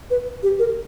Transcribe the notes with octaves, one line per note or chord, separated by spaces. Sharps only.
B4
G4
A#4